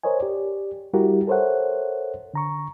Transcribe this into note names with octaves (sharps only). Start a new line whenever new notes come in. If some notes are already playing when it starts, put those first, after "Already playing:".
A#4 C5 C#5 D#5 G#5
G4 D5
G3 E4 F#4 G4 A#4
A4 A#4 C5 C#5 E5 F#5
D3 A#5 C#6